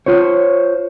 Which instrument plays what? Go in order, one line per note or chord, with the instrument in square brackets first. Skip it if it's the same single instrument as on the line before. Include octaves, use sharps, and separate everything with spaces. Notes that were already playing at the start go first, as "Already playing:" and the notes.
[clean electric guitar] F4 C5 C#5